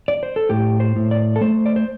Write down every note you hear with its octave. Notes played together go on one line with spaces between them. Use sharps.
D5
C5
A4
A2 G4
C5
A2
D5
A4
A3 C5
D5
C5